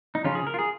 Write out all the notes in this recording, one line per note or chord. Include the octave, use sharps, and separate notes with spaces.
D#4
C#3 F3 C#4 F4
G#4
A#4
F4
G#4